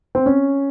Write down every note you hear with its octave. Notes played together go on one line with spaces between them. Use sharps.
C4
C#4